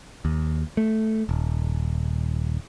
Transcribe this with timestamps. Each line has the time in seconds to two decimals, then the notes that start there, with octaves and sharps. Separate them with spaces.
0.25 D#2
0.77 A3
1.29 D#1